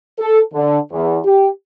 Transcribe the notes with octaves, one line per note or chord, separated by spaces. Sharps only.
A4
D3
E2
G4